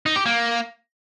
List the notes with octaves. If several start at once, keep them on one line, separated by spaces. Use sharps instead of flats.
D#4
G4
A#3